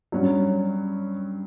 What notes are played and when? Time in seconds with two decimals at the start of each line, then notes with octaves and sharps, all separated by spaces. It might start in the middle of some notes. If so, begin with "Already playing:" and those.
0.12 G2 F#3 C#4